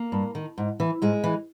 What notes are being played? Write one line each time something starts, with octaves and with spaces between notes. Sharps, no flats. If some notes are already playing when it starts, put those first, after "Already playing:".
Already playing: A#3
G2
D#3
G#2
E3
G#2 G#3
E3